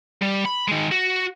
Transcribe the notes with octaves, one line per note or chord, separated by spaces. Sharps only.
G3
B5
D#3 G#3
F#4